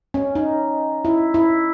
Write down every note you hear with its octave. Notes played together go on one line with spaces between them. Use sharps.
C#4
D#4
E4
E4